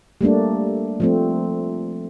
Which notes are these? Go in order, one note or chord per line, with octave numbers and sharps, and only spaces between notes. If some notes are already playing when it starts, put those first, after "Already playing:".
G3 A3 A#3 D4
F3 A3 C4